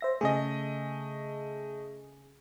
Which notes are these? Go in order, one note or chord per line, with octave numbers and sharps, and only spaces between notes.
C5 E5 A#6
C#3 A3 G#4 D#5